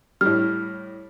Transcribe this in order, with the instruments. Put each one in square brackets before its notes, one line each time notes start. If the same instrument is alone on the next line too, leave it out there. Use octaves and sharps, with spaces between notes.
[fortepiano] A2 G3 [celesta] F6